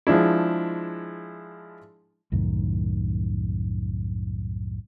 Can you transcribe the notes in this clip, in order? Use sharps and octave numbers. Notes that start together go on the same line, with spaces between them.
F3 G#3 D4 E4
C2 F#2 A2 D#3